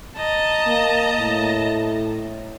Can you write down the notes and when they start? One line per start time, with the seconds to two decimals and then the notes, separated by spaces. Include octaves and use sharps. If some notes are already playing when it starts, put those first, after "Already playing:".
0.16 D#5 A5 A#5
0.67 A#3
1.19 A2